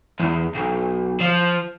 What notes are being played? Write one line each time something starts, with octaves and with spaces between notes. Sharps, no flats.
E2
B1
F3